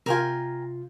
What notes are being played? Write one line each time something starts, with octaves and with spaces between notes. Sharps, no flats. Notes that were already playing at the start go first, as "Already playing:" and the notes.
C3 F4 A#4 G5 G#5